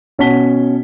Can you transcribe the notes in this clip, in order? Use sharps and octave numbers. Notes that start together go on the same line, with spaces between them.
B2 C#4 F#4 A5 B6 G7